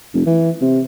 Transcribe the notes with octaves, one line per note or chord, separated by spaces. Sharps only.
F1
E3
C3